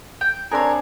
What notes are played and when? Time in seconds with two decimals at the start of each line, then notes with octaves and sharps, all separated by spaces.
0.21 G5
0.51 C4 D4 G#4 A#4 C#5